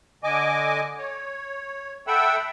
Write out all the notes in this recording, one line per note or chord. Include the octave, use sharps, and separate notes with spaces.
D3 D#5 G#5 D6
C#5
A4 E5 F#5 G5 B5 E6